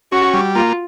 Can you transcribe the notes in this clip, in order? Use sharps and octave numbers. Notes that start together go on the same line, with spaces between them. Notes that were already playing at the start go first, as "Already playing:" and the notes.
C#4 F#4
G3
A#3 F4